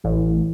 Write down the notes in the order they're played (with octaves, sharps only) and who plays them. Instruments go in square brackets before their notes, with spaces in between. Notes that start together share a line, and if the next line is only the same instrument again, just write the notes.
[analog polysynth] A1